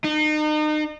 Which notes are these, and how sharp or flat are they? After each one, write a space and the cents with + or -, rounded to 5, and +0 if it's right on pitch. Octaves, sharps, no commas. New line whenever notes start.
D#4 -35